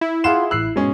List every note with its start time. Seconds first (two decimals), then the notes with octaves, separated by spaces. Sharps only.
0.01 E4
0.24 F4 G#4 F#5 C6 E7
0.51 A1 E6 F#6 C7
0.76 G#2 B2 G#3 C#4 G#4